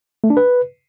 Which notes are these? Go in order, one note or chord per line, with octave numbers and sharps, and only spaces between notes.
A3
D4
B4